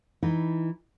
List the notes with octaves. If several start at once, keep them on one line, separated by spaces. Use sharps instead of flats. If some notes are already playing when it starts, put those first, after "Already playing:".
E3 D#4